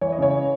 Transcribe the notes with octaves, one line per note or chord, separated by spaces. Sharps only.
E3 C#5
D#5
C#3 C#5